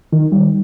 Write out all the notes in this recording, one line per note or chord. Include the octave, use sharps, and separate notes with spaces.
D#3
G3